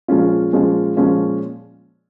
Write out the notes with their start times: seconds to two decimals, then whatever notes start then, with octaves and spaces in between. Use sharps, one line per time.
0.08 A#2 F3 G#3 C#4 F4
0.53 A#2 F3 G#3 C#4 F4
0.97 A#2 F3 G#3 C#4 F4